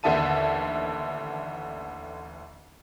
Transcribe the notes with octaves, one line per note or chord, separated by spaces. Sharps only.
A1 D#2 D3 E5 A5 D#7